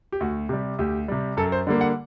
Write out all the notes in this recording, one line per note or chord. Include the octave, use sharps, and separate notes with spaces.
G4
D2 F#4
C3 G3 G4
D2 G4
C3 G3
F#2 A4
C5
D3 G3 A#3
F#5